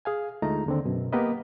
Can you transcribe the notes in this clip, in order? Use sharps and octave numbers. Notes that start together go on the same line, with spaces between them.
G#4 F5 G#5
D2 G#3 A3 D#4 F4 A#5
D#2 D3 C4
F#2 B2
A#3 B3 G4 A#4 B4 D#5